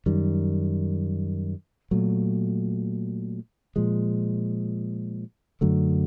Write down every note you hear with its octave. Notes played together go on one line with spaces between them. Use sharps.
F#2 D#3 G3
A#2 F#3 A3
A#2 F3 G#3
F#2 D3 F#3 A3